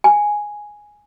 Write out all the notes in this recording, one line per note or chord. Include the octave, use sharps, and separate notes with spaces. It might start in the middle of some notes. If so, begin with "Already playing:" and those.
G#5